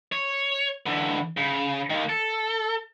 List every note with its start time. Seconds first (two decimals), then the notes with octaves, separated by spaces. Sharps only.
0.12 C#5
0.86 D3 E3
1.37 C#3
1.90 D#3 A#3
2.09 A4